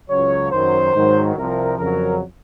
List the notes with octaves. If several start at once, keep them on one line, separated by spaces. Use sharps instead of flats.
C#2 C#3 F#3 C#5
F#2 D#3 F#3 C5
G#2 D#3 F#3
C2 C3 F3 A#4
F2 C#3 F#3 A#4